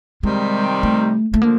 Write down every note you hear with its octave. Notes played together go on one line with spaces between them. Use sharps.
C3 D#3 G3 G#3 C4 D#4
A3
A3
D3 F3 A#3